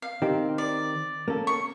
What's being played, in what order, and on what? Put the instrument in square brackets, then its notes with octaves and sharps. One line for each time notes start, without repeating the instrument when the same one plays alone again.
[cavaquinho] F5
[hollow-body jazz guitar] D#3 C4 G4
[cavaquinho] D5
[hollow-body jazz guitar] A#3 C#4 A4
[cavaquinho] C#6